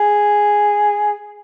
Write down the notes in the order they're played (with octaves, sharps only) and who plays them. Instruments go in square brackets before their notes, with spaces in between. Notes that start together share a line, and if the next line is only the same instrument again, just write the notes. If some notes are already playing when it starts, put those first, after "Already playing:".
Already playing: [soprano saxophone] G#4